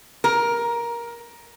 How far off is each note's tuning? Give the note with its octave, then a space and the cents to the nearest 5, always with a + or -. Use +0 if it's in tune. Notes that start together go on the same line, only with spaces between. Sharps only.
A#4 +15